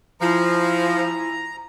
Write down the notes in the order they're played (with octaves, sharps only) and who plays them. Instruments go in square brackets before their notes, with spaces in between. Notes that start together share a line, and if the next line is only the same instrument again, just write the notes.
[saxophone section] F3 [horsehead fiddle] E4 G#5 [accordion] A#5